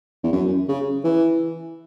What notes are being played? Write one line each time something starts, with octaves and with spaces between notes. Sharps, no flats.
E2
F#2
C#3
E3